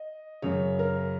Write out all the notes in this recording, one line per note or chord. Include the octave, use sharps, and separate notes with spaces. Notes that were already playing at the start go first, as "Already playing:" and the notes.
Already playing: D#5
F#2 C#3 C#5
A#4